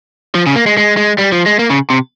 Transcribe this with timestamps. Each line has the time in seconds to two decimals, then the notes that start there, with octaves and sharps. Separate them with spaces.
0.35 F3
0.47 C#3
0.56 A#3
0.66 G#3
0.78 G#3
0.97 G#3
1.18 G3
1.32 F3
1.46 G#3
1.59 A#3
1.70 C#3
1.90 C3